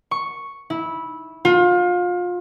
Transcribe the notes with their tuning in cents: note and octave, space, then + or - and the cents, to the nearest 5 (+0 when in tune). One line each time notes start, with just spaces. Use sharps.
C#6 +0
E4 -15
F4 +30